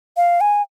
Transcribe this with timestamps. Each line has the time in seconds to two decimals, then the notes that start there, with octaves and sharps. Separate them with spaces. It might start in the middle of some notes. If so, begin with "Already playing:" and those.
0.17 F5
0.41 G#5